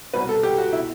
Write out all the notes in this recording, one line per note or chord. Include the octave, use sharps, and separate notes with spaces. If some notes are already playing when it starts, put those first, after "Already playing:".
C2 B2 B4
A4
G4
F#4
E4
B2